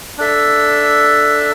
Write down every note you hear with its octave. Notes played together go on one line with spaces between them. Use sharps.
D4 A4 E5